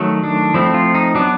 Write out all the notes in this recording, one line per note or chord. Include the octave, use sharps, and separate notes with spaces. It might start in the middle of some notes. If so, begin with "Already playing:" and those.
Already playing: D#3 F#3 A3
D4
F3 A3 C4 E4
F4
D#4
F#3 B3 D4